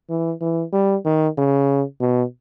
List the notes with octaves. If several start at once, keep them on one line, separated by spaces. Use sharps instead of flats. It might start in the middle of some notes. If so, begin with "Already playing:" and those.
E3
E3
G3
D#3
C#3
B2